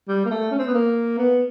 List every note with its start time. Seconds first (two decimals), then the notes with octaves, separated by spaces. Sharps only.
0.08 G3
0.25 A#3
0.31 A3
0.51 C#4
0.58 C4
0.67 B3
0.74 A#3
1.18 B3